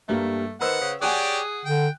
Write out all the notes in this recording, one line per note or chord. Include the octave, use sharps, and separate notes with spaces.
G2 G3 A3 A#3
D#3 B4 C5 F#5 E6
C#3
G4 G#4 C#5 D5 F#5 G#5 F#6
D3 G5